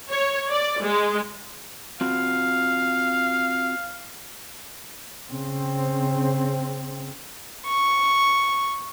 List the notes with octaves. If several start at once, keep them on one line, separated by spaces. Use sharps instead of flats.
C#5
D5
G#3
C4 F4 F#4 F5
C#3 C4
C#6